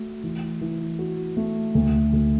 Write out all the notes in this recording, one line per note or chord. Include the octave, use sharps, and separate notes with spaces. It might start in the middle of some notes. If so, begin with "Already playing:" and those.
Already playing: A3 F#4
E3
E3
F#4
A3
D2
D2